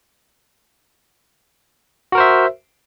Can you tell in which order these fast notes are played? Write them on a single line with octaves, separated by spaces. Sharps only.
F#4 A#4 C5 E5